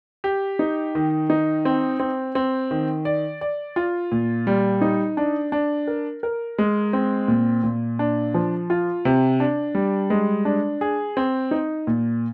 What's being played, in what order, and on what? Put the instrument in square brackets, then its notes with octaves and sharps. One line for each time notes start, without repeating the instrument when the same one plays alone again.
[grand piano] G4
D#4
D#3
D#4
C4
C4
C4
D#3
D5
D5
F4
A#2
G3
D#4
D4
D4
A#4
A#4
G#3
C4
A#2
A#2
D4
F3
F4
C3
D4
G3
G#3
D4
G#4
C4
D#4
A#2